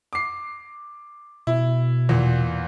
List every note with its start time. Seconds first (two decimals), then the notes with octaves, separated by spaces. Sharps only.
0.13 D6 C7
1.47 B2 E4
2.09 E2 A#2